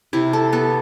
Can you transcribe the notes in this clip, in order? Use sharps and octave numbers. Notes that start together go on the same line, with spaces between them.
C3 E4
A4
B3 A4